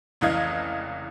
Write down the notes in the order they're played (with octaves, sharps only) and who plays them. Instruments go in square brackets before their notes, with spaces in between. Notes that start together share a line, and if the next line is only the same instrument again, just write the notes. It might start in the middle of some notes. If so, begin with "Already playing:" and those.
[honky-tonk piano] F1 C#2 E3 D#5 F5 G#6